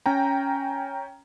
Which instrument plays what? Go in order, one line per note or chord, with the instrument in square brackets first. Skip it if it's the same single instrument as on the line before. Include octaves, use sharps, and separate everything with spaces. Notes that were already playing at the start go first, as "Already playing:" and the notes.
[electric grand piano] C#4 G5 A#5